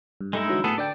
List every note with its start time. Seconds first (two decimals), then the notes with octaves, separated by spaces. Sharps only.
0.21 G2
0.33 G2 G#3 A3 D#4 E4
0.48 D3 E3 F#3
0.64 A2 B3 G#4 A4
0.78 D3 D4 D5 G5